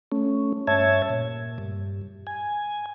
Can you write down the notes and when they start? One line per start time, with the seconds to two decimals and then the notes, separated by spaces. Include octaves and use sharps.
0.12 A3 C#4
0.67 G2 C#5 E5 A5 G#6
1.10 A#2
1.58 G2
2.27 G#5